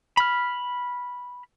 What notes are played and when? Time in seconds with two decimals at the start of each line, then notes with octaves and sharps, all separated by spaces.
0.17 B5 F6